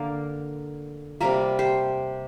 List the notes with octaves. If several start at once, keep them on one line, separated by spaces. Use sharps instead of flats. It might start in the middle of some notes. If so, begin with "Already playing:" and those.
Already playing: D3 A#3 A#4 D5
C3 G3 A#3 A#4 D5
G4 C5